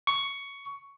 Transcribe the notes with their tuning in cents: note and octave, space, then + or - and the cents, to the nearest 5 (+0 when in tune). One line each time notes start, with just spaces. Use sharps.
C#6 +10